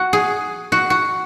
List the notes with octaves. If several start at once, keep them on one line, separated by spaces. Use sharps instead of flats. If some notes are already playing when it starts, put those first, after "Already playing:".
Already playing: F#4
G#4
F#4
F#4